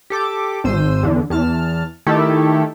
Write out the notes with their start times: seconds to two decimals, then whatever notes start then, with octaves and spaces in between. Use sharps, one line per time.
0.10 G4 A4 D6
0.64 G#1 C5 E6 D#7
1.03 E2 D3
1.30 E2 A5 F6
2.07 D#3 A3 E4 G4 A4